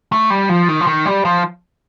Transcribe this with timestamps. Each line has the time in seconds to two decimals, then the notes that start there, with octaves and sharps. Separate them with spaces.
0.12 A3
0.30 G3
0.49 F3
0.69 D#3
0.81 F3
0.87 D#3
1.06 G3
1.25 F3